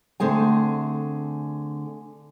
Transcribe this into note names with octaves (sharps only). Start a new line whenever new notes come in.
D3 A3 C4 G#4 G#5